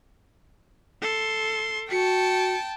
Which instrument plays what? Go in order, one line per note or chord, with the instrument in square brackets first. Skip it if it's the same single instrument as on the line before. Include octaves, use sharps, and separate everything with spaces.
[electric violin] A4 C6
[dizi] F#4 [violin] G5 A5 [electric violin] C#7